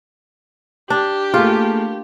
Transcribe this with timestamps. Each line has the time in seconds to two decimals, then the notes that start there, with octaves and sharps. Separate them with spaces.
0.90 D4 G4
1.34 A3 A#3 F4 G#4